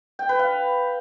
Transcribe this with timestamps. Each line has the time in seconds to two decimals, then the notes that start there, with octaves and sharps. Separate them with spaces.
0.19 G5
0.29 B4
0.39 F5